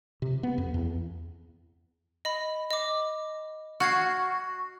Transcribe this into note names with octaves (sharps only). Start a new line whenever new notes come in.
C3
B3
F2
E2
D#5 B5
D#5 D6
F#4 F6 G#6 C7